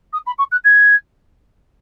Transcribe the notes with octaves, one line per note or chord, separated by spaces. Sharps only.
D#6
B5
C#6
F#6
G#6